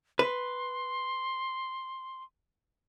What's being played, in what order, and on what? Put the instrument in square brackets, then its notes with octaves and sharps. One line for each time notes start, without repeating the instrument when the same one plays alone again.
[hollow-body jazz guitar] B4 [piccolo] C6